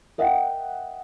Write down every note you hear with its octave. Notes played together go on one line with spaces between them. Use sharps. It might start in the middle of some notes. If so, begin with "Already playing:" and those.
A#4 D#5 E5 F#5 G5